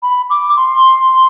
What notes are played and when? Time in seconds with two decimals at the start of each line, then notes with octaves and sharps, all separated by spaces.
0.03 B5
0.30 D6
0.56 C6